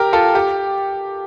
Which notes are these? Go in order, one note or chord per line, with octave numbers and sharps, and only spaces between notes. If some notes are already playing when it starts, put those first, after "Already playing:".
Already playing: G4 A#4
F4 A4
G4